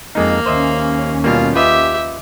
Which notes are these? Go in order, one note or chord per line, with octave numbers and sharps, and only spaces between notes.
F2 G#3 A#3 D#4 F5
D#2 C#4 C5 D#5 E5
B2 G3 A#3 F4
F4 G4 B4 D#5 E5